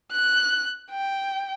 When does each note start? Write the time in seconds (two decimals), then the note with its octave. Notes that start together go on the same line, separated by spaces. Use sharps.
0.12 F#6
0.91 G5